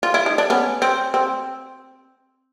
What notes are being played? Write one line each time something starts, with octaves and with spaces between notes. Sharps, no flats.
F4
E4
D#4
D4
B3 C#4
C4
C4